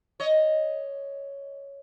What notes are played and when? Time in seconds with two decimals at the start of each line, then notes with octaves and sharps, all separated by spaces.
0.20 C#5 D#5